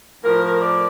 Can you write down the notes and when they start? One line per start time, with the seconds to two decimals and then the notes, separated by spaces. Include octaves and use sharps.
0.24 A2 F3 A#4
0.61 D5